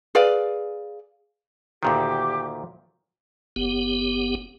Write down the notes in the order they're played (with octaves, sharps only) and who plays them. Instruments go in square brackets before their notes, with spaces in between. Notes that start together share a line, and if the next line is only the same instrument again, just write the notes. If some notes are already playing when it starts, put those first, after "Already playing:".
[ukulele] G#4 B4 D5 F5
[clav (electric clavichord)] D2 A#2 D#3 [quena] G4
[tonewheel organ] F#1 B3 G4